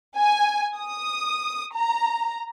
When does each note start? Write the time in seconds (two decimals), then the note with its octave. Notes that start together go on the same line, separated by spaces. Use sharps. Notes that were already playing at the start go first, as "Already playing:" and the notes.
0.17 G#5
0.77 D#6
1.74 A#5